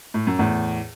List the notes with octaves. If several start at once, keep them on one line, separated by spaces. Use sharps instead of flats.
A2
F#2
E2 A2